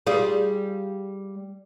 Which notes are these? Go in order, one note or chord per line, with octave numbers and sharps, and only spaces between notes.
G3 F4 G#4